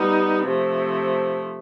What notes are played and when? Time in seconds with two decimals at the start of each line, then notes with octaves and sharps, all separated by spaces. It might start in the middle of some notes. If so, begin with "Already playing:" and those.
Already playing: G3 B3 D#4
0.45 C3 F3 A3